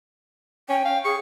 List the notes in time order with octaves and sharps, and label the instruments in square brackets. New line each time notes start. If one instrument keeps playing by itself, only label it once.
[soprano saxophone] C#4 [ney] G5
[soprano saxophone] F5
[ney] G#4 [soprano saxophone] C#6